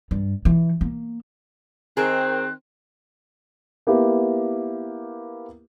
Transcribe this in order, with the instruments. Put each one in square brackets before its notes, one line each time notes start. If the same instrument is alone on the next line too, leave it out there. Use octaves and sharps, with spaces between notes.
[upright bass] G2
E3
A#3
[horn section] D#3 C4 [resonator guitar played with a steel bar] G#4 A#4 [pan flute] F#6
[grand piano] A#3 B3 E4 G4 A#4